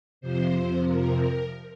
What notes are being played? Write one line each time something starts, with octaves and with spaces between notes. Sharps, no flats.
F2 C3 F3 C5
A#4